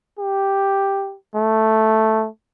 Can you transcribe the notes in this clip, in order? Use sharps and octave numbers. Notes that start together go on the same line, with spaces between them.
G4
A3